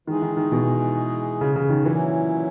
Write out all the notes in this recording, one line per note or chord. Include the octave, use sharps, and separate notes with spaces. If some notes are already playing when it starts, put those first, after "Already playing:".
D#3 E3 G#3 D#4 G#4
D#3
D#3
B2
C#3
C#3
D#3
A#2 E3 F#3 C#4 E4